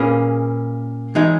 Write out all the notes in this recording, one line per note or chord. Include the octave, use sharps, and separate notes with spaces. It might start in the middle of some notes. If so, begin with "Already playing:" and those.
Already playing: A#2 A#3 C#4 G#4 B4
E3 G#3 D#4 G#4